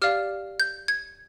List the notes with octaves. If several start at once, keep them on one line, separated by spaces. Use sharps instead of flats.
G4 D5 F5 F6
G6
G#6